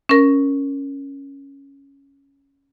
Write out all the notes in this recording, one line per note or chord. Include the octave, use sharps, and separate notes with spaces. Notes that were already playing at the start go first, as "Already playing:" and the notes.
C#4 A#4